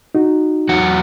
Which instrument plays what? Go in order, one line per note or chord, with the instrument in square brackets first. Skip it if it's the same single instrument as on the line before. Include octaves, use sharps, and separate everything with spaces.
[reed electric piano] D#4 F#4
[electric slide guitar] E2 F#3 F#5